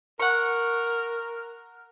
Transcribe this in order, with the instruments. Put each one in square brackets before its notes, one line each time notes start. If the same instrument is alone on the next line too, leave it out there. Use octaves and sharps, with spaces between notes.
[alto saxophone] A#4 [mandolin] F#5 C#6